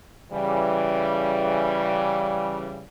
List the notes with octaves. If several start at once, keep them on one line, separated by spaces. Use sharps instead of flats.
C#3 E3 G3